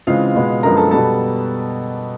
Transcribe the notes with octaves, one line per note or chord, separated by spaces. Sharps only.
C#3 E3 G#3 C4 F4 F5
B2 G#3 B3
F#2 D3 F3 G#3 B3 A#4 A#5
A4 A5
B2 G3 B3 A4 A5